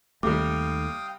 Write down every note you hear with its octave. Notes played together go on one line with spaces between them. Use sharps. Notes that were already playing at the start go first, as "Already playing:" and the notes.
D#2 C3 G3 A3 F5 G5 D6 D#6